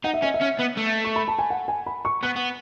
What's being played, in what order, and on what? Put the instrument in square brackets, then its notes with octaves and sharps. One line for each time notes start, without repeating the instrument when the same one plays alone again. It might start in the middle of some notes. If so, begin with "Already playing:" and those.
[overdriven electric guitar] D#4 [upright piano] F#5
[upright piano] E5
[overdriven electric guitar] C#4 [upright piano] D#5
[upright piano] E5
[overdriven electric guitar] C#4
B3
A3
[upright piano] C#6
B5
A5
G#5
F#5
G#5
B5
C#6
[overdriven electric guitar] B3 [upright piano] F#6
[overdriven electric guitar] B3